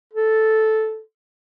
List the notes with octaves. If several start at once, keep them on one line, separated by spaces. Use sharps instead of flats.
A4